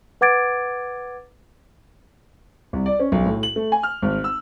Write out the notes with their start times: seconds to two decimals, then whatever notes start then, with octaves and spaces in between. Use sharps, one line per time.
0.21 B4 F#5 D6 G#6 A6 D7
2.73 C2
2.86 D5
3.00 C#4
3.12 B1
3.26 A2
3.43 F#7
3.56 A3
3.72 G#5
3.83 F6
4.02 G#1
4.24 E6